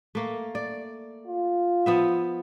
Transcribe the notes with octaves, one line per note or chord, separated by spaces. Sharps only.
A3 A#3
D5
F4
F3 B3 E5